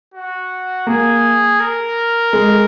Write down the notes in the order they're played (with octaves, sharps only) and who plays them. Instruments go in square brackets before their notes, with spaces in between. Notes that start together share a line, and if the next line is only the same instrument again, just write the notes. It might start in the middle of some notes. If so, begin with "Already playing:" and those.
[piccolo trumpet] F#4
[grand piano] A#3 [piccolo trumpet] G#4
[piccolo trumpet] A#4
[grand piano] G#3